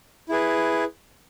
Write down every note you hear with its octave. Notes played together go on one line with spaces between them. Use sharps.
E4 G#4 B4